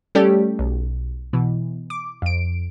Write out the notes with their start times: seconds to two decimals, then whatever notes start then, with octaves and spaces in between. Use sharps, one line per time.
0.15 G3 A3 C#4 G4 A4 D5
0.59 B1
1.33 B2 E3
1.90 D6
2.22 F2 D7